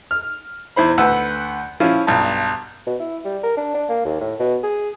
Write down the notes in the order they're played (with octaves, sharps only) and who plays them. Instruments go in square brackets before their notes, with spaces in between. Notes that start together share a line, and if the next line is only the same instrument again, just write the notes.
[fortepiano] F6
E2 E4 C5 B5
D2 B4 F#5 E6
F3 C#4 E4 F4
B1 G2 A5
[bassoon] B2
E4
G3
A#4
D4
D4
A#3
D#2
A2
B2
G#4